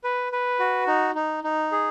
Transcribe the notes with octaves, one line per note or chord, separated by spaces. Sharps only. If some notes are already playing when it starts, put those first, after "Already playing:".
B4
B4
F#4
D#4
D#4
D#4
G#4